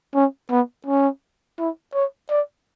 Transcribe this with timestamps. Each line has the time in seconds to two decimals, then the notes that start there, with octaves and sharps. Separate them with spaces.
0.14 C#4
0.50 B3
0.86 C#4
1.58 E4
1.94 C#5
2.30 D5